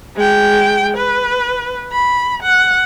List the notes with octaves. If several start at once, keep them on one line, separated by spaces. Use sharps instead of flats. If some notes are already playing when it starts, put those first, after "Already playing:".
G#3 G5
B4
B5
F#5